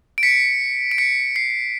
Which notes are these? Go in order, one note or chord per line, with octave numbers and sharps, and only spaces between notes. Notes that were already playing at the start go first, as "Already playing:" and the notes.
D7
B6 C#7
D7
B6 C#7
C7